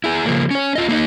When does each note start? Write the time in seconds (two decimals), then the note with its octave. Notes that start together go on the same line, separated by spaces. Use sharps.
0.04 E4 G#4
0.26 C#3 F3 A#3
0.51 C#4 C#5
0.75 F4 D#5
0.89 A#3 D4 D#4 D#5